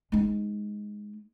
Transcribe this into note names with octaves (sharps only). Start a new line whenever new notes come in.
G#3 D#4